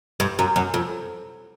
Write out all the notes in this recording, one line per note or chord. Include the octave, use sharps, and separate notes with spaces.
G2
F#2
F#2
F2